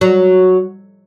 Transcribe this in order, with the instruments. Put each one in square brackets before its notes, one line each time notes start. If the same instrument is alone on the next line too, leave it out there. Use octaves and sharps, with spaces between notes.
[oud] F#3